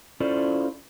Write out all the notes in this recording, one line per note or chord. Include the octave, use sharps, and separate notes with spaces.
C#4 E4 F4 A4 C5 D5